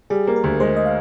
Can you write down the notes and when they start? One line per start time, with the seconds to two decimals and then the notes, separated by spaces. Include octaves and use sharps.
0.10 G3 G#4
0.27 A#3
0.36 A#4
0.44 D2
0.60 G#3 C5
0.76 D#5
0.86 F5